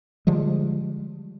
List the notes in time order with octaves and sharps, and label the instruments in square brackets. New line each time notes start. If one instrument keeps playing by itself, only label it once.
[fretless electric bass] D3 F3 G3 G#3